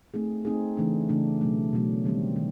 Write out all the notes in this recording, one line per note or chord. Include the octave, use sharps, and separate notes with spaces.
A3 C4 D#4 G#4
A3 C4 D#4 G#4
C#3 E3 A3 D4
C#3 E3 A3 D4
B2 F#3 A3
B2 F#3 A3
D#3 G3 C4
D#3